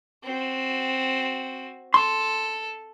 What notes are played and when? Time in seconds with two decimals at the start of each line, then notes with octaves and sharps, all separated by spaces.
0.24 C4 F#4
1.94 A4 C6